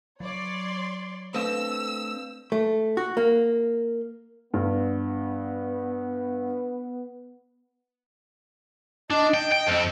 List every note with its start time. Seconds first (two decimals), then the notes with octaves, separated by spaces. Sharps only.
0.20 F#3 C#5 D5 C6
1.35 A3 C4 D4 B4 F5 E6
2.52 A3
2.97 F#4
3.17 A#3
4.54 G2 B3
9.10 D4 D#5
9.34 G5
9.52 G5
9.67 F2 C4